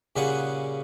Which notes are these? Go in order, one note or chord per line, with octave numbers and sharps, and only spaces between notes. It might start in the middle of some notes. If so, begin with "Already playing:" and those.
A#2 C#3 G3 G#4 F#5